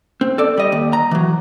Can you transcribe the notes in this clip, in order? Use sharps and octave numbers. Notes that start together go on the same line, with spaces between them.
C4
A4 D5
G3 D#5
D#2
A#5
E3 F#3